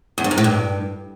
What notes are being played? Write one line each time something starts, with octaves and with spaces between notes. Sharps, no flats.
E2
G2
F#2
A2
G2